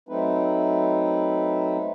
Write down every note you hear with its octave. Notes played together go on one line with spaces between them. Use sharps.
F#3 A3 C4 D#4 B4